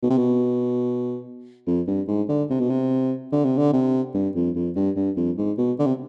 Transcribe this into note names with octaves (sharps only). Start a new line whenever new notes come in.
B2
C3
B2
F2
G2
G#2
D3
C3
B2
C3
D3
C3
D3
C3
G2
F2
F2
G2
G2
F2
G#2
B2
D3
C3